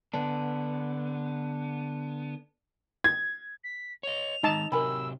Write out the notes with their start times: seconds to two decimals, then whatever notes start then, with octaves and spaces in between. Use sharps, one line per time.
0.14 D3 B3 D4
3.04 G#6
3.64 B6
4.03 C#5 D#5 F7
4.43 D#3 G#3 D#4 A5
4.72 C3 F#3 G4 A#4 G#5 B5 E6